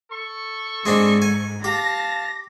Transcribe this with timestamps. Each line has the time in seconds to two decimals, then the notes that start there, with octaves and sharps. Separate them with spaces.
0.11 A4 C#6
0.86 G#2 G#3 C4 D4
1.22 G#5
1.64 G4 F5 A5 A#6